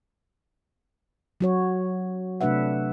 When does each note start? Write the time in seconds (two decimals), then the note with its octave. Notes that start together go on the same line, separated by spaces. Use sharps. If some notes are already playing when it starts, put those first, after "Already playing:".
1.41 F#3 F#4 C#5
2.41 C3 A3 D4 B4 E5 F#5